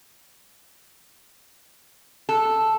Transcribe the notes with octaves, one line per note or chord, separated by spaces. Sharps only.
A4